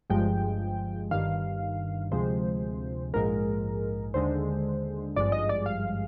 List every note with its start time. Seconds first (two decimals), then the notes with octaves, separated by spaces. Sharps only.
0.10 G1 G2 F3 G#3 G5
1.11 G1 G2 D#3 F5
2.12 D2 C3 F3 G#3 C5
3.14 A#1 G#2 F3 G#3 A#4
4.14 D#2 D3 G#3 C5
5.16 G#1 G2 F3 G#3 D5
5.32 D#5
5.49 D5
5.66 F5